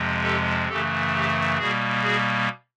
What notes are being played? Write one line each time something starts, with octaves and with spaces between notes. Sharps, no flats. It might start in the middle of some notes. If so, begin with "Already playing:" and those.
Already playing: F2 C3 F3 G#3
G4 A4
F#2 C#3 E3 A3 G4 A4
G4
B2 G3 A#3 F#4 G#4
F#4 G#4